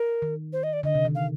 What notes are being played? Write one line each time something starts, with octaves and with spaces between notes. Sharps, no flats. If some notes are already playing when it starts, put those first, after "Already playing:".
Already playing: A#4
D#3
C5
D#5
D5
D3 D#5
C3
D#3
F5